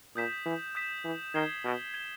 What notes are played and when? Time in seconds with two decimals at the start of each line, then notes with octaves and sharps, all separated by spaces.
0.16 A#2 D#6 G6 B6 E7
0.46 E3
0.75 D#6 G6 B6 E7
1.04 E3
1.34 D#3 G#6 C7 E7 G7
1.65 B2
1.94 G#6 C7 E7 G7